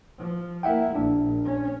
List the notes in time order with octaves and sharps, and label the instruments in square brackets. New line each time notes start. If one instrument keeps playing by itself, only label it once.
[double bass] F3
[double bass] A#3 E4 [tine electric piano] E5 F#5 G5
[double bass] A#1 [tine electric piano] D4
[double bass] C#4